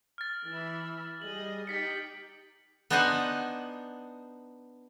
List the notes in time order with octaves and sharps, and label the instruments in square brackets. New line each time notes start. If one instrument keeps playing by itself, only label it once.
[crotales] F6 A6
[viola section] E3 E5 B5
[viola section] G3 G#4 D#5 [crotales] F#7
[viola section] D#4 G4 G5 [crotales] A6 B6 C#7
[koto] B3 D4 D#4 C5 F#5 G#5